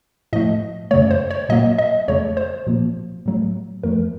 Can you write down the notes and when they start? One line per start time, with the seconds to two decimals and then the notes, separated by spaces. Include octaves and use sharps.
0.33 A2 F3 A3 D#5
0.91 F#2 C#3 A3 C#5
1.11 C5
1.31 C#5
1.49 A#2 F#3 A#3 D#5
1.78 D#5
2.08 F2 C#3 A3 C#5
2.37 C5
2.67 A#2 F3 A#3
3.26 A2 F#3 A3
3.83 F#2 F3 A3 A#4